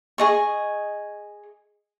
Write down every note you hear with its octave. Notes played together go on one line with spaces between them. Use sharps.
G#4 D#5 C#6